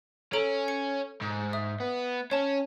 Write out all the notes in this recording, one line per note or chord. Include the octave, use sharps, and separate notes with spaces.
C#4 A4 A#5 D7
C#7
G#2
E5 D#6
B3
C#4 C#5 A5